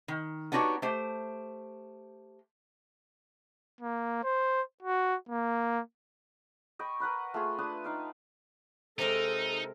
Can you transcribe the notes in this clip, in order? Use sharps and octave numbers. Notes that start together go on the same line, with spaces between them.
D#3
B3 D4 D#4 F#4 G4 C#5
A3 G4 C5
A#3
C5
F#4
A#3
D#5 G5 B5 C#6
A#4 B4 F#5 B5
A3 F4 G#4
D4 B4 A5 D#6
D#4 F5 G5
C3 G#3 D#4 A4 A#4